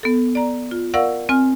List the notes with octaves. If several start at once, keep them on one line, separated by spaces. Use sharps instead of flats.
B3 A4
D5 A#5
F4
A#4 D5 F5 F#5 C#6 E6
C4 G#5 F6